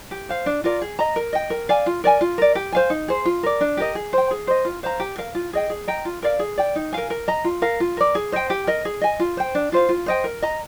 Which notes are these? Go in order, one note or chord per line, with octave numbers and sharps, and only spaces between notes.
G4
C5 F5
D4
F4 A#4 D5
G#4
D#5 A#5
A#4
D#5 G5
A#4
D5 F5 G#5
F4
A#4 D5 G#5
F4
A#4 D5
G4
C5 F5 G#5
D#4
G#4 C5
F4
A#4 D5
D4
G4 A#4 D#5
G#4
C5 G5
G#4
C5 D#5
F4
C5 F5 A#5
G4
A#4 F5
F4
G#4 D#5 G5
G#4
D#5 G5 A#5
F4
A#4 D5 F5
G#4
D5 G5
D#4
A#4 F5 G#5
A#4
D#5 A#5
F4
A#4 F5
F4
A#4 D5
G#4
C5 D#5 G5
G4
A#4 D#5
G#4
D#5 G#5
F4
C5 G5
D4
F4 C5 F5
F4
C5 D#5 G5
A#4
D#5 A#5